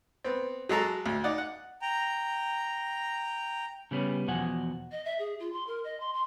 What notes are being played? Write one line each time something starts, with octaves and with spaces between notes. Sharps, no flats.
B3 C4
F#3 G#3 A4 A#5
D2
D#4 D5 F#5
F#5
G5 A#5
C#3 G3 B3 C#4
E2 B2 F3 F#5 G#5
D#5
E5
G#4
F4
C6
A#4
D#5
C6
C6